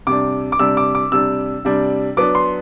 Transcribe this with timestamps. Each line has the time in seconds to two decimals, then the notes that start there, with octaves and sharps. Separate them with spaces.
0.07 C3 G3 D4 D6
0.52 D6
0.59 C3 G3 D4 E6
0.77 D6
0.95 D6
1.12 C3 G3 D4 E6
1.65 C3 G3 D4
2.17 F#3 B3 D4 D6
2.35 C6